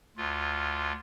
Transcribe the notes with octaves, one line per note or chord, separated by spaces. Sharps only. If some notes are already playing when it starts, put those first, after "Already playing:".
D2 F4